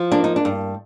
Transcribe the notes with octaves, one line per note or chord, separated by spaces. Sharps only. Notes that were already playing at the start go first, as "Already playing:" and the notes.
Already playing: F3
A#3 D4
D#4
D4
G2